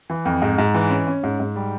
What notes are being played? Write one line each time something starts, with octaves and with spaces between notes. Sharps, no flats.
E3
F2
G#2
G#2
E3
C#4
C#4
G#2
G#2
G3